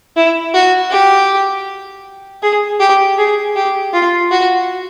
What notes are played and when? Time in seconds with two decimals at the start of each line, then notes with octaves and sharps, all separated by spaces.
0.16 E4
0.54 F#4
0.91 G4
2.42 G#4
2.80 G4
3.18 G#4
3.56 G4
3.93 F4
4.31 F#4